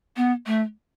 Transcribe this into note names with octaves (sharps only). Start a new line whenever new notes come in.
B3
A3